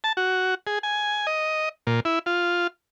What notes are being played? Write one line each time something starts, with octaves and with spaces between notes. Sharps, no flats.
A5
F#4
G#4
G#5
D#5
A#2
E4
F4